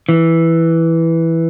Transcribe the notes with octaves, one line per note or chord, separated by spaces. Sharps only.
E3